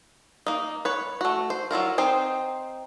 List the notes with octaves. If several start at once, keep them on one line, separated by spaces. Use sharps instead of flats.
A#3 D#4
B4 C#5
A3 F#4
C5
F#3 E4 F4 A#4
C4 D#4 C5